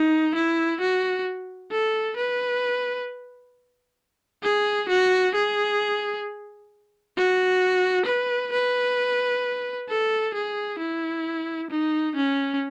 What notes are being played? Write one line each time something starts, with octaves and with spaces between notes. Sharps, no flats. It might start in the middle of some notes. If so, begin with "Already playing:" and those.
Already playing: D#4
E4
F#4
A4
B4
G#4
F#4
G#4
F#4
B4
B4
A4
G#4
E4
D#4
C#4